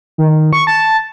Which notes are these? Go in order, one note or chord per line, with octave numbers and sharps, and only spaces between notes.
D#3
C#6
A5